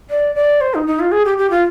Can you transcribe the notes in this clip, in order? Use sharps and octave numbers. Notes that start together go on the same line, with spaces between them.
D5
D5
C5
D#4
D#4
F4
G#4
G4
G4
F4